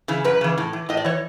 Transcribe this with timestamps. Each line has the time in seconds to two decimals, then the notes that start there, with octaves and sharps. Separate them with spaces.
0.08 C#3 E3
0.24 F#2 B4
0.41 C#3 E3
0.58 A2
0.73 E3
0.89 A2 D#5
0.97 D5
1.05 E3 C#5